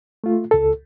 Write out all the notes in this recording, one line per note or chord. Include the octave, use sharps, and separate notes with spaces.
A3 F4
C#2 A4